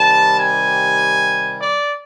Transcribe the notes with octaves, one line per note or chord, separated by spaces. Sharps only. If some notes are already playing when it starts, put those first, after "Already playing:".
Already playing: C3 D#3 G3 A5
G#5
D5